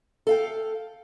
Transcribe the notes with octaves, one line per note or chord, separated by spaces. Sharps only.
A4 F5 G5